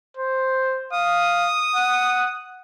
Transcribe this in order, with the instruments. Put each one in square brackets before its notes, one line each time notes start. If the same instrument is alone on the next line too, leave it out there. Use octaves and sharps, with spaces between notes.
[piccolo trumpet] C5
[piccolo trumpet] F5 [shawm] D#6
[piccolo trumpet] F#5